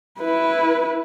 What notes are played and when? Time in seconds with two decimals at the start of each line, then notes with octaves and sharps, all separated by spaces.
0.19 E4 B4